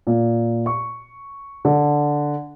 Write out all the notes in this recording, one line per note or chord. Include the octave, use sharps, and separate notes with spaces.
A#2
C#6
D3